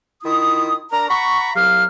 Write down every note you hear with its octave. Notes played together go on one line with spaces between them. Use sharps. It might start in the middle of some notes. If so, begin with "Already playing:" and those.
D#3 E4 F4 D#6
D4 A#4 A#5
F#5 A#5 B5 C#6
C2 F#3 G4 F5 F6